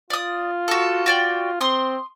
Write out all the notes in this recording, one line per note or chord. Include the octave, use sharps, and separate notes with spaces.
F4 D5 D#6
F#4 A4
F#4 D5 G5
C4 C6 D#6